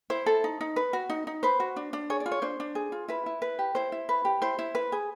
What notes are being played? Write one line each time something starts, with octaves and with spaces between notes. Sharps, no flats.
E4 C5
A4
D#4
D#4
B4
F#4
D#4
D#4
B4 C5
F#4
D4
D4
G#4 C#5
D5
F4
C#5
D4 C5
D4
G#4
F4
E4 B4
E4
B4
G4
E4 C5
E4
B4
G4
E4 C5
E4
B4
G#4